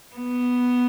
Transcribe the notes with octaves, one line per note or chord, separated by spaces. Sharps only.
B3